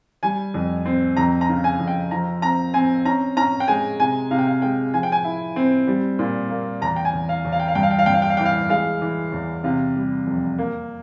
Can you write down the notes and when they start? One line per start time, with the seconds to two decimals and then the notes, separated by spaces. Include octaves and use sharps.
0.23 G3 G#5
0.54 F2
0.86 C4
1.17 F2 A#5
1.41 A#5
1.49 C#3
1.64 G#5
1.80 F2
1.88 G5
2.11 F3 A#5
2.42 C4 A#5
2.74 C4 G#5
3.05 C#4 A#5
3.37 C#4 A#5
3.60 G5
3.68 G#3 G#5
3.99 C3 G#5
4.31 C3 F5
4.39 G5
4.47 F5
4.62 G#3 G5
4.93 F3 G#5
5.03 G5
5.12 G#5
5.24 E4
5.56 C4
5.87 G3
6.19 A#2
6.50 A#3
6.82 E2 A#5
6.96 G5
7.05 G#5
7.13 E2
7.29 F5
7.45 E2
7.52 F5
7.60 G5
7.68 F5
7.75 G2 G5
7.83 F5
7.91 G5
7.98 F5
8.06 G2 G5
8.14 F5
8.22 G5
8.30 F5
8.37 E3 G5
8.45 F5
8.69 G#3 F5
9.02 E3
9.32 E2
9.64 C3 F5
9.95 G3
10.27 F2
10.58 A#3